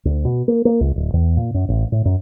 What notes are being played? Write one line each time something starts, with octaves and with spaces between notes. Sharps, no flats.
D2
B2
A#3
A#3
C#2
D1
E2
A#2
F#2
A1
A2
F#2